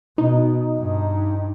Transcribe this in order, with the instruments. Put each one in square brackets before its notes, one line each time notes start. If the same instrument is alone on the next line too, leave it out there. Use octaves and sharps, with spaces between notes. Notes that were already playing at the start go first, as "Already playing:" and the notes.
[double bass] B2 [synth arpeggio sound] D#4
[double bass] G2